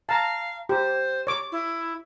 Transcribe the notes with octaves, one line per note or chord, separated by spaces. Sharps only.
F5 A5 A#5
G4 C5
C#5 D6
E4